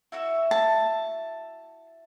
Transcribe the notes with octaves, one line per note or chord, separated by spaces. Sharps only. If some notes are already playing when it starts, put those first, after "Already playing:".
E4 F#4 E5
A5